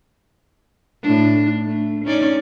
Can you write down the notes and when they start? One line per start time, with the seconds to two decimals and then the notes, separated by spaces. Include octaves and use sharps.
1.02 A2 D4
1.65 A3
2.04 C#4 D#4 D5